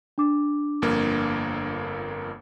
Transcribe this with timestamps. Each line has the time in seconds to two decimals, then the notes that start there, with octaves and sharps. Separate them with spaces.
0.18 D4 D6
0.82 G1 F2 A#3